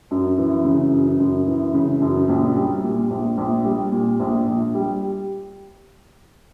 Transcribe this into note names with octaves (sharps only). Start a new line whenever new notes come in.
F#2
E3
C#3
F#2
F#2
E3
C#3
F#2
A#1
G3
A#2
A#1
A#1
G3
A#2
A#1
A#1
G3